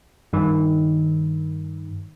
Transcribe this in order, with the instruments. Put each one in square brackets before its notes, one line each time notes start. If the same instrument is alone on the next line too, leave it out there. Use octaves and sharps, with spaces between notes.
[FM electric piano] G2 D#3